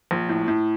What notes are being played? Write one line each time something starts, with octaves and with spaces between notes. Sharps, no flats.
A#1
A2
A2